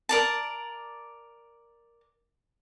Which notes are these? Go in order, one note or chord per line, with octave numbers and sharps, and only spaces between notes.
A#4 D5 A5